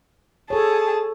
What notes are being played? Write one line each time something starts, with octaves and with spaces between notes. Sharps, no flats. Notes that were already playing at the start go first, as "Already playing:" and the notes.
G#4 A4 C#5 A5